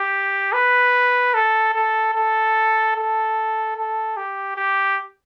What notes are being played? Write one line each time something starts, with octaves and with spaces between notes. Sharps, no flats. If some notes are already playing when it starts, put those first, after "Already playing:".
Already playing: G4
B4
A4
A4
A4
A4
A4
G4
G4